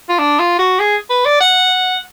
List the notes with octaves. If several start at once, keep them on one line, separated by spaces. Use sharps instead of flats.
F4
D4
F4
F#4
G#4
B4
D5
F#5